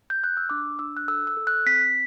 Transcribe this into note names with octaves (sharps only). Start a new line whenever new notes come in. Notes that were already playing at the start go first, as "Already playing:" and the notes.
G6
F#6
E6
D4 D6
D4 E6
F#6
A4 E6
E6
A4
F#6
C4 B6